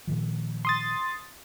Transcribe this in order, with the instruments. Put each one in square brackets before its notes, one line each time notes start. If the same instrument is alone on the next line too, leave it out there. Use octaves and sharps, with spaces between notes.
[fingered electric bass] A#2 D#3 F3
[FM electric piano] C6 D#6 A6